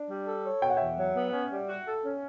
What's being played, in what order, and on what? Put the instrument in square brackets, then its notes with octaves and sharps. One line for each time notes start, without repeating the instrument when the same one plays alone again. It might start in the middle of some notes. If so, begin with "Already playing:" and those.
Already playing: [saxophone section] D4
G3
A4
C#5
[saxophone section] B2 [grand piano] G5
[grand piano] F#5
[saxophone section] E2 [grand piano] E5 G5
[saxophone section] F#3
B3
C#4
G3
F#4
A4
C#4